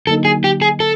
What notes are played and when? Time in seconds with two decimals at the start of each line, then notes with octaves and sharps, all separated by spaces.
0.07 D3 F#3 A#3 D#4 A4
0.25 G#4
0.44 G4
0.62 G#4
0.80 A4